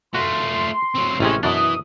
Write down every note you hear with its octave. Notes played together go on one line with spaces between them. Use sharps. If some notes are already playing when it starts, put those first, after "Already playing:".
A3 F4 F#4 C6
F#3 C4
A1 C3 E3 G#3 C#4
F#2 B2 E3 D4 D#6